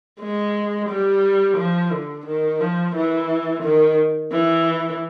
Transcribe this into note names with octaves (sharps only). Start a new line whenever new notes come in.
G#3
G3
F3
D3
D#3
F3
E3
D#3
E3